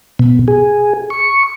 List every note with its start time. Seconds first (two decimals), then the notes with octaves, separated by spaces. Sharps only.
0.19 B2
0.48 G#4
1.10 C#6